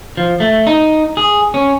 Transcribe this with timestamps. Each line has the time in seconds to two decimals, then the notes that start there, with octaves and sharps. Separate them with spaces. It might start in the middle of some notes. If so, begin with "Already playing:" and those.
0.17 F3
0.40 A3
0.67 D#4
1.17 G#4
1.54 C#4